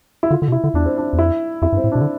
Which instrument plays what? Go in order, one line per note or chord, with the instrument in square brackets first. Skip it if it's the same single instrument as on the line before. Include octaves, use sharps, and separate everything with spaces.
[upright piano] E4
[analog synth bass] D3 [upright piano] F4
[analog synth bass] D3
B2
[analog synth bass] C3 [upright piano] E4
[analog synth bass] D3
[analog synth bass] E2 [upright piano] D4
[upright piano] C4
D4
[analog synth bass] E2
[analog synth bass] F2 [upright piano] E4
[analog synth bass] F2 [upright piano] E4
[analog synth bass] G2
[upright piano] C4
[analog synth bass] A2
[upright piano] D4
[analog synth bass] B2
D3